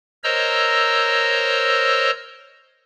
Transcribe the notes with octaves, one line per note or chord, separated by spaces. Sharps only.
A#4 C5 C#5 D#5 A#5 E6